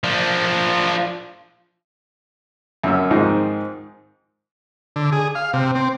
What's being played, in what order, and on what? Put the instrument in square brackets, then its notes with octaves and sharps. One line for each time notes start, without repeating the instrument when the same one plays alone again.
[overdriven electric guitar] F3 D4
[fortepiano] F#2 A#3 C#4 E6
G#2 D#3 F3 C4 D#4
[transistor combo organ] D3
G#4
F5
C3
C4